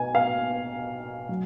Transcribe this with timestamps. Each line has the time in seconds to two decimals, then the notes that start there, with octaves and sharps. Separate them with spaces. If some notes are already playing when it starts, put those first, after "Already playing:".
Already playing: B2 G#5
0.15 F5
1.29 F#3